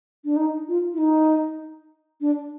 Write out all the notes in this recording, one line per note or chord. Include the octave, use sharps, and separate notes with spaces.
D4
D#4
F4
E4
D#4
D4